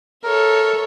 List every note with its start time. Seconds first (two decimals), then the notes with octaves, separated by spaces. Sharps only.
0.23 A4 A#4 C#5 E5